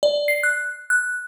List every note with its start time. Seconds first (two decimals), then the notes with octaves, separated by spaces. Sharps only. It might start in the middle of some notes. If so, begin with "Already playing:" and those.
0.03 D5
0.28 C7
0.43 F#6
0.90 F#6